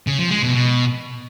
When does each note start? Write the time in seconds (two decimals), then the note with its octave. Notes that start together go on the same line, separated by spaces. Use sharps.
0.07 C#3
0.19 F3
0.31 G#3
0.43 B2
0.54 B2